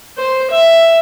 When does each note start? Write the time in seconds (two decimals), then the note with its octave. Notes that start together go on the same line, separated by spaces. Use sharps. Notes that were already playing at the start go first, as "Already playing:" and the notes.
0.18 C5
0.51 E5